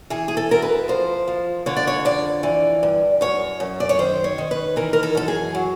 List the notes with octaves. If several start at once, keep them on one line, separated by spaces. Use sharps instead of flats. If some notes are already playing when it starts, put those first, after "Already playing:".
E3 G#4
G#4
A4
D2 A#4
B4
F3 C5
F3
D3 C#5
D5
C#5
F2 D5
E3
G2
F#2 C#5
F#2
D5
C#5
D#3 C5
C#5
D#3
B4
E3 A#4
A#4
A4
F#2 A4
G#4
F#3